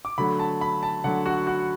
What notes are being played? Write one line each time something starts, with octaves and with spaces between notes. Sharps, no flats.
D6
D3 F#3 A3 B5
A5
B5
A5
D3 F#3 A3 F#5
F#4
F#4